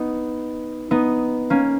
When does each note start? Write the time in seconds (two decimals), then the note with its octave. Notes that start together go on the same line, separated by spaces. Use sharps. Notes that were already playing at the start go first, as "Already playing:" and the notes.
Already playing: B3 D#4
0.91 B3 D#4
1.50 A#3 C#4